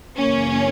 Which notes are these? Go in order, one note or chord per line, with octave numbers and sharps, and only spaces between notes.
F#2 C#3 E3 A#3 C#4